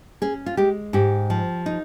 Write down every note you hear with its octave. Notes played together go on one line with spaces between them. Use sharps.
C#4 G#4
F4
G#3 G4
G#2 G4
F3
D#4